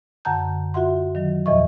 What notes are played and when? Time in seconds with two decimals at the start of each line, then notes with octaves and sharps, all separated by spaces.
0.25 F#2 D3 F#5 A5 A#5 G6
0.74 F4 F#4 E5 F#5 C6
1.15 D#3 F#3
1.46 E2 A#2 F3 D#5 E5 C#6